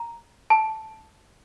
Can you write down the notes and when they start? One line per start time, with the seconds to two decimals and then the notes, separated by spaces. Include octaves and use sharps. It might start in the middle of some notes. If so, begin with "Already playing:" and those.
Already playing: A#5
0.50 A5